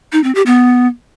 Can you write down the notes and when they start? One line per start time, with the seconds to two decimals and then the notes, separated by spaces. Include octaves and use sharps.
0.13 D#4
0.24 C4
0.35 G4
0.46 B3